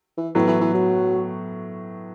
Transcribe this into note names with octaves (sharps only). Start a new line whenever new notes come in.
E3
A2 E3 F#3 B3
E3
E3
F#3